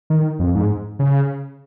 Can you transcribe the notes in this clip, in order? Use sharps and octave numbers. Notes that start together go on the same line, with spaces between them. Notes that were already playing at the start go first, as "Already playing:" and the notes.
D#3
F2
G#2
C#3